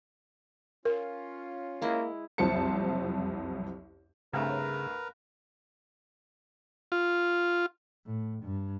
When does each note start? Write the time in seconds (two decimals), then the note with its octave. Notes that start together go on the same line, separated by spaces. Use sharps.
0.85 C#4 F4 A#4
1.82 G#3 A#3 E4 D#5
2.38 F#1 C2 F2 C5 A5 C#7
4.33 C2 G2 C#3 A3 A#4 B4 A#5
6.92 F4
8.06 A2
8.44 G2